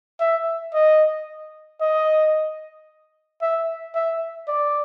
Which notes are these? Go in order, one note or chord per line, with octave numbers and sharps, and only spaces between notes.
E5
D#5
D#5
E5
E5
D5